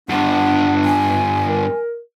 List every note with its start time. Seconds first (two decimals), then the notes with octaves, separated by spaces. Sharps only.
0.09 G2 B3 D4 F#5
0.85 G#5
1.46 A#4